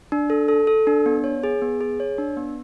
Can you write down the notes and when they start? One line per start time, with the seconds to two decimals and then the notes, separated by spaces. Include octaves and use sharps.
0.12 D4
0.30 A4
0.48 A4
0.67 A4
0.87 D4
1.06 B3
1.24 C#5
1.44 G#4
1.62 B3
1.81 G#4
2.00 C#5
2.18 D4
2.37 B3